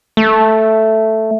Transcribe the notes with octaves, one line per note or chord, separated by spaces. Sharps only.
A3